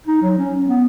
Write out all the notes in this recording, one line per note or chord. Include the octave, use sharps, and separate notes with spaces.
D#4
F#3
C#4
B3